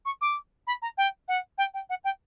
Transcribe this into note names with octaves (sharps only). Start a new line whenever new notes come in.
C#6
D6
B5
A#5
G5
F#5
G5
G5
F#5
G5